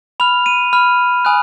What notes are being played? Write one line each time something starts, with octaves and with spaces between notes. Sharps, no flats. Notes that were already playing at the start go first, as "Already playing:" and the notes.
B5 F6 F7
D#7
B5 F6
G#5 B5 D#6 F#6